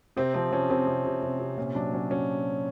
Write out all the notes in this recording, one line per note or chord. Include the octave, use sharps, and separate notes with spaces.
C3 C4
F3 C4
F3 C#4
C3 C4
C3
C3
C3
C3
A#2 C#4
F#3 D4
F#3 C#4
F#3 C#4